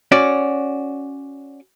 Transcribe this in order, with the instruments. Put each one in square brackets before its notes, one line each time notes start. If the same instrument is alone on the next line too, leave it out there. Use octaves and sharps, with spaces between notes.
[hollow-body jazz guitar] C#4 F#4 D5